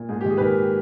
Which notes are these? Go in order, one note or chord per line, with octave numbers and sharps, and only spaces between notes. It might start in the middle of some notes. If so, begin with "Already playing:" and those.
Already playing: A#2
G#2 G#4
G4
D#3 G#4
B4
D#3 A#4